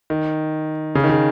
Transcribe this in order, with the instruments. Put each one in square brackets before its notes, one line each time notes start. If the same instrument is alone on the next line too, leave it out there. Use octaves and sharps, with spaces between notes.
[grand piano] D#3
C#3
D#3
C#3